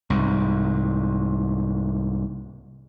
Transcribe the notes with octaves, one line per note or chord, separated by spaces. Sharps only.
C2 G#2